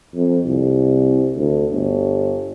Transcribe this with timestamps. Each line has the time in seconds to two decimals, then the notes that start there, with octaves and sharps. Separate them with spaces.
0.15 F2
0.46 C2
1.36 D2
1.71 G1